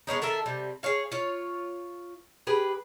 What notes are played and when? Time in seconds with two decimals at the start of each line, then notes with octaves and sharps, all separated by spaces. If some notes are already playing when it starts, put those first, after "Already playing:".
0.07 G#3 B3 C#4 D#4
0.22 D#3 A4 A#4 E5
0.46 C3 G3
0.83 G#4 A4 C#5 F5
1.12 F4 C#5
2.47 G4 G#4 B4